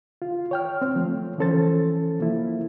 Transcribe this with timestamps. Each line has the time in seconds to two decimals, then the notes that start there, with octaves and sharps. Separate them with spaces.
0.22 F4
0.51 C#5 G5 F6
0.82 C4
0.96 F3 A3
1.38 E3 F3 C#4 A4 C5 A6
2.20 F3 A#3 E4